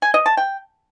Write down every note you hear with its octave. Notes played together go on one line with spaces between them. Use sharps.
G#5
D#5
A5
G5